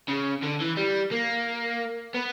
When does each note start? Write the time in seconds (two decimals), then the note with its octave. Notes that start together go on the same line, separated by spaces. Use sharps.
0.09 C#3
0.43 D3
0.60 E3
0.77 G3
1.11 A#3
2.15 B3